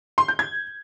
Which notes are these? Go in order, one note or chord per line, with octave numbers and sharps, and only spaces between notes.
C6
G6
G#6